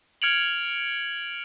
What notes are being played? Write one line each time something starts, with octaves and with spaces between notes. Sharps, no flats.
F6 G#6 C#7 D7 F7 F#7